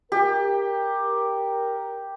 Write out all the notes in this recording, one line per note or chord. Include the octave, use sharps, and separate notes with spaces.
G4 A#4